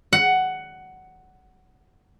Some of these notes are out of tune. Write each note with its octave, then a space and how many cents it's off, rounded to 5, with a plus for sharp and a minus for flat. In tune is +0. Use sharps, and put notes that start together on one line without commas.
F#5 +10